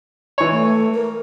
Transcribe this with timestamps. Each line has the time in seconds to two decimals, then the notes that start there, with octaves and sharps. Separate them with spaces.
0.38 E3 C#5
0.51 A3
0.94 A#4